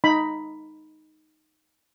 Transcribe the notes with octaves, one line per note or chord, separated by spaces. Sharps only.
D#4 B5